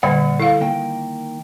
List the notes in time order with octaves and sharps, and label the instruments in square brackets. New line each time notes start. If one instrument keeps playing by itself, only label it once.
[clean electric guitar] A#2 D5 F#5 [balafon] D3 G3
[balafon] E4 F5 [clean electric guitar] A4
[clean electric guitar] D#3 A#3 G5